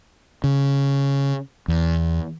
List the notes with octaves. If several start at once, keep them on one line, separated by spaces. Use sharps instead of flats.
C#3
E2